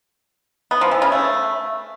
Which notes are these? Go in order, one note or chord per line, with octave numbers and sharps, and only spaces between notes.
B3
F3
E3
C#3
A3